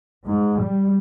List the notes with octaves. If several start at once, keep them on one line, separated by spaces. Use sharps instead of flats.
G#2
G3